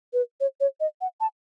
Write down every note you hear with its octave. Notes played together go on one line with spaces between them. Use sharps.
B4
C#5
C#5
D#5
F#5
A5